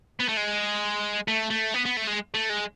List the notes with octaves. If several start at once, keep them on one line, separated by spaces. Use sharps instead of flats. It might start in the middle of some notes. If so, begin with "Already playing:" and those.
B3
A3
G#3
A3
A3
B3
B3
A3
G#3
A3
G#3